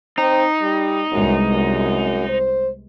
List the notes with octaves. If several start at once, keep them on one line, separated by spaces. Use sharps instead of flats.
C4 D#4
G3
C2 F#2 G#3 B3
F#2
C5